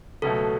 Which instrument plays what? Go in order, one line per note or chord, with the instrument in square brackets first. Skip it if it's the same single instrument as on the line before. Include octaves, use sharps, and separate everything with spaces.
[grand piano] C#2 B2 F#3 A3 [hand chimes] A4